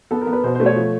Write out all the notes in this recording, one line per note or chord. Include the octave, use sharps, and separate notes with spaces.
B3 A4
A#4
B3
B4
B2 C5
C5
A3
C#5
F3